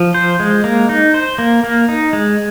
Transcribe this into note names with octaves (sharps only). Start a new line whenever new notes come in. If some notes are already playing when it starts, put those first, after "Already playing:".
Already playing: F3
C5
G#3
A#3
D#4
C5
A#3
A#3
D#4
G#3